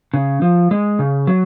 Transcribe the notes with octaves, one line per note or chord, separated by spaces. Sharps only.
C#3
F3
G#3
C#3
F#3